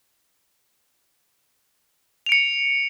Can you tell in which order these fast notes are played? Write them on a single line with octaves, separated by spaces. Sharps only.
F7 D7 C#7